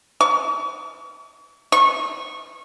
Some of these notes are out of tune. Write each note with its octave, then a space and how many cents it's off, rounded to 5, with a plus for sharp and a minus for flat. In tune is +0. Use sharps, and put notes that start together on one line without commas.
C#6 +35
C#6 -20